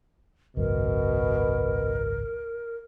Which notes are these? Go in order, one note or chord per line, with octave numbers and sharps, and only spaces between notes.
G#1 C#2 F#2 B2 A#4